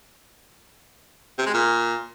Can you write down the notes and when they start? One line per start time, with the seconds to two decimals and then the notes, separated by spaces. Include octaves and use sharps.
1.38 C3
1.46 G#3
1.54 A#2